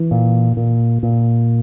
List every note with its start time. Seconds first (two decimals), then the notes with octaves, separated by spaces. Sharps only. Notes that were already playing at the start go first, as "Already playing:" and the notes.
Already playing: E3
0.11 A#2
0.57 A#2
1.03 A#2